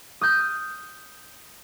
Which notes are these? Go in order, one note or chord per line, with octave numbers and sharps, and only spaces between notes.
D#6 F6 G6